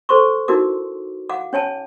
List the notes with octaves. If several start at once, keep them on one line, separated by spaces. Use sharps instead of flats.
A4 C5 C6 C#6
D#4 E4 F#4 A#4 D6
F5 F#5 D6
C#4 C#5 G#5 A5